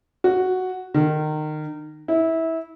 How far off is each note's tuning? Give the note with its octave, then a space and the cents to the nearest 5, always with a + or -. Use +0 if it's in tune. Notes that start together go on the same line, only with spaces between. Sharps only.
F#4 +0
D#3 -25
E4 -20